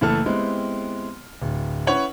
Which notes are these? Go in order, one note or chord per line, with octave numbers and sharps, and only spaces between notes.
F#1 E3 A3 A4 A5 F6
G#3 B3 C4 E4 G4
D1
C#4 E4 B4 C#5 F#5